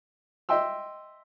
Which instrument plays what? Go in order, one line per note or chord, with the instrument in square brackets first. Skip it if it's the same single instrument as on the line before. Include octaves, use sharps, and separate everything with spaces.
[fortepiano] D#5 E5 G5 C6 E6